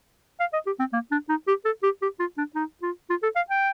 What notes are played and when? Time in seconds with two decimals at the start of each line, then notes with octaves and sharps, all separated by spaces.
0.40 F5
0.53 D#5
0.66 G4
0.79 C4
0.93 A#3
1.11 D4
1.29 D#4
1.48 G4
1.65 A4
1.83 G4
2.02 G4
2.20 F4
2.38 D4
2.55 D#4
2.82 F4
3.10 F4
3.23 A4
3.36 F5
3.50 G5